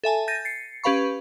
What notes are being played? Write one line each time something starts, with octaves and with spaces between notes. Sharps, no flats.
A4 E5 G#5 A5
G6 A6 A#6 D#7
A6 C7 C#7
C#4 G4 B4 F5 B5 C#6